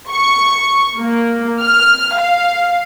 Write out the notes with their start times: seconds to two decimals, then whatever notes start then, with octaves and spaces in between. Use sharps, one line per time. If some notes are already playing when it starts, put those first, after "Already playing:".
0.11 C#6
0.99 A#3
1.59 F6
2.19 F5